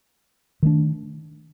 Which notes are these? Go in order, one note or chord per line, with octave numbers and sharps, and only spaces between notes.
D#3 A3 D4